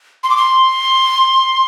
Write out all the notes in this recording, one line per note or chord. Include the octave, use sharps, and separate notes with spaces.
C6
D6
C6